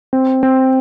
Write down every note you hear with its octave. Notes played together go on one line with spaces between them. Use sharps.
C4
C4